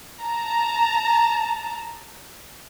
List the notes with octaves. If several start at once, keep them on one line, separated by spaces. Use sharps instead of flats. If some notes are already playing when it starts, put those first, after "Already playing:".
A5 A#5